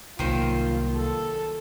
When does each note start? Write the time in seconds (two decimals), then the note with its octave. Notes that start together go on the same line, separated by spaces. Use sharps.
0.19 C2 D#3 F#3 A#3 F4 C5
0.96 A4